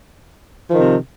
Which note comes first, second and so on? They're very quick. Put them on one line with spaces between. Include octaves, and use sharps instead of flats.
F3 D#3 C3